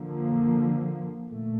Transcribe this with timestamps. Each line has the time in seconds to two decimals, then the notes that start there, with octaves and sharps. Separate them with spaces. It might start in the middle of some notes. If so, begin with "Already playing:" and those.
Already playing: D3 F3 A#3
1.29 A#2 A3